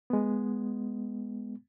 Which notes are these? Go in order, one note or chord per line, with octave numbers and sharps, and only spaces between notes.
G#3 B3